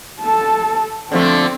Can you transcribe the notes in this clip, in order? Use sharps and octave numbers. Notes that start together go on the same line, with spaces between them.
A4 A5
D3 F3 A3 C4